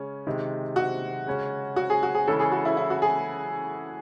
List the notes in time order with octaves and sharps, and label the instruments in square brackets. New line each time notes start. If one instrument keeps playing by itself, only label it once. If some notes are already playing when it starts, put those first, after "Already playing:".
Already playing: [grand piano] C#3 G#3 C#4
C3 D#3 G#3 D#4
[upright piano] F#4
[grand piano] C#3 G#3 C#4
[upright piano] F#4
G#4
F#4
G#4
[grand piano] C#3 E3 G#3 C#4 E4 [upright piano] A4
[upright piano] G#4
F#4
E4
E4
F#4
G#4